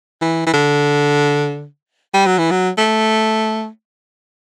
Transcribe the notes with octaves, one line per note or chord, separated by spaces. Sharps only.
E3
E3
D3
G3
F#3
E3
F#3
A3